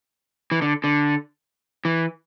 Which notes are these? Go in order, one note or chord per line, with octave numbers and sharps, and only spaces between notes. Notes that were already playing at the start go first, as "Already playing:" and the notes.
E3
D3
D3
E3